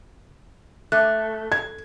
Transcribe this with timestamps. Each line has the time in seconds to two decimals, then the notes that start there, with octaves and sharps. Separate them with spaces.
0.92 A3 F#6
1.52 G#6